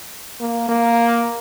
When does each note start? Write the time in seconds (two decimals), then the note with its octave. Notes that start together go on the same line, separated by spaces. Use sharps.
0.40 A#3
0.69 A#3